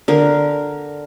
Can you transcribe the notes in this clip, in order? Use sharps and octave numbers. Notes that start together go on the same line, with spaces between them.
D3 A#4